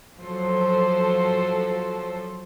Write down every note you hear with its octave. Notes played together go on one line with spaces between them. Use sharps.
F3 F#3 A4 C5